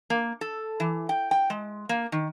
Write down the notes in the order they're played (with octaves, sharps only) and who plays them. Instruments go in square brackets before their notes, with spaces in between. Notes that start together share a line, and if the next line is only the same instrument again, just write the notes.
[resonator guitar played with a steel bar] A#3
A4
E3
G5
G5
G#3
A#3
D#3